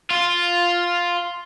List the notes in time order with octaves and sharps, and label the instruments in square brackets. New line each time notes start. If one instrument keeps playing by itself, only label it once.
[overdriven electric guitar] F4